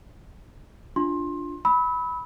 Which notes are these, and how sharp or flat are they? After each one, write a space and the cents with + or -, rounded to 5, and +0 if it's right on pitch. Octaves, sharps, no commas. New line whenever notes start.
D4 +0 F4 +0 C6 +20
B5 +0 E6 -35